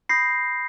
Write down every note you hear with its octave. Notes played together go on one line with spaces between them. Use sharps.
B5 D#6 G6 A#6 C7